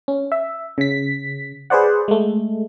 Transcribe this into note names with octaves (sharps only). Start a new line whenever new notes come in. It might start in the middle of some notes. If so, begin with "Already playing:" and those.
C#4
E5
C#3 B6
G#4 B4 C5 D5 F#5
G#3 A3